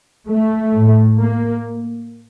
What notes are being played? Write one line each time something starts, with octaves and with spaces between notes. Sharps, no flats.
A3
A2
A#3